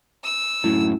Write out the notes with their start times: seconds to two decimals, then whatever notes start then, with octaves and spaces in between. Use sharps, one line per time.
0.24 E6
0.64 F#2 A2 E4